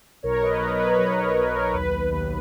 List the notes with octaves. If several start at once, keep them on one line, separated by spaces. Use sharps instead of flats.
B1 A#4 C#5
B4 D#5
B4
B1 A#4 C#5
B4
C#5
B1 B4 D#5
A#4 C#5
B1 B4
A#4 C#5
A#4
D#2 B4
D#2